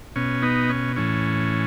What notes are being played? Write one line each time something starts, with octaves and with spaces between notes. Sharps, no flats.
B2 C#4
B3 D#4
C#4
A2 E3 C#4